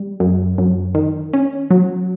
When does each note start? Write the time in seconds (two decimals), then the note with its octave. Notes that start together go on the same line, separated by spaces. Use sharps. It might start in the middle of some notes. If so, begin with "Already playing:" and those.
Already playing: G3
0.20 F#2
0.58 F#2
0.95 D#3
1.33 C#4
1.71 F#3